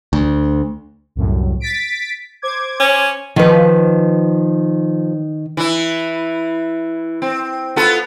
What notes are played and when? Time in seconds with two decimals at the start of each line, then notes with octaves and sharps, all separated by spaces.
0.13 D2
1.16 C2 F#2 A2
1.60 A6 B6 D7
2.42 C5 D6 G#6
2.80 C#4
3.36 D#3 F3 B4
5.57 E3 E4
7.22 C4
7.76 B3 F4 A4